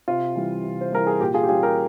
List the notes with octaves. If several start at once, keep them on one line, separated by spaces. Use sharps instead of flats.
C3 F4
E3 G3
C3
C5
E3 G3 A#4
G#4
A#2 G4
F4 G#4
G4
G3 A#3 C#4 F4 G#4
G4 A#4